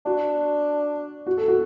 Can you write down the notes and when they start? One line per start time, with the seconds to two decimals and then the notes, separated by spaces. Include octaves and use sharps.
0.06 D4 F#4
1.27 F#4
1.37 A4
1.48 F#4